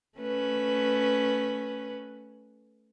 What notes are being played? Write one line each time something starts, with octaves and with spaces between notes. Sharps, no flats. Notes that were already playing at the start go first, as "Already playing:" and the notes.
A3 C#4 B4